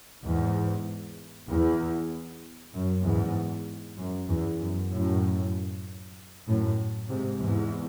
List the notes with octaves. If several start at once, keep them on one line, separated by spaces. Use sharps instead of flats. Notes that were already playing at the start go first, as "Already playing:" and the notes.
E2 G#2
E2
F#2
E2 G#2
F#2
E2
F#2
F#2 A2
F#2 A2
G#2 C3
E2 G#2